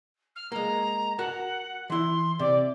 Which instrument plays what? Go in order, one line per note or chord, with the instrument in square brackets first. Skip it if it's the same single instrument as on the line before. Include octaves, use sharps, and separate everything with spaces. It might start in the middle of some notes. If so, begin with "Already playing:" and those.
[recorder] F6
[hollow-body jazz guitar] G#3 A#3 [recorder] A#5
[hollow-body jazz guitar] F#4 A#4 A5 [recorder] F#5
[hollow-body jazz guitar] E3 E4 [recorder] C6
[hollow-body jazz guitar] C3 [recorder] D5